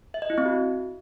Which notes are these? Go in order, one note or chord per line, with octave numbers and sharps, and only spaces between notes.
E5
D#5
E4
C4
F#4